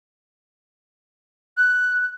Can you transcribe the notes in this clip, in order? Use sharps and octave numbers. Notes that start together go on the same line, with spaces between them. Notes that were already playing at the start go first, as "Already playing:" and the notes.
F#6